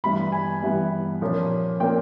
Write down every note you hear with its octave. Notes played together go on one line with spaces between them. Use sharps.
G2 E3 G3 B3 B5
G#5
G2 E3 G3 B3
A#2 F3 A#3 C#4
A#2 F3 A#3 C#4 G5